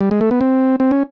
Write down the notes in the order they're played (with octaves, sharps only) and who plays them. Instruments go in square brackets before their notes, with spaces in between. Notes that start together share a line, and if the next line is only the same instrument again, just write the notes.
[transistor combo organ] G3
G#3
A3
B3
C4
C4
C#4